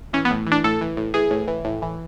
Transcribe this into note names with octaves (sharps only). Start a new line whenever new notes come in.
E3 C#4
B3
A2
E3
D4
A2 A4
E3
A2
E3 G#4
A2
E3
A2
E3